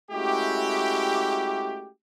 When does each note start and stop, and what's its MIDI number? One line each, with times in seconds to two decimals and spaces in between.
0.11 1.89 56
0.11 1.89 57
0.11 1.89 61
0.11 1.89 64
0.11 1.89 66
0.11 1.89 67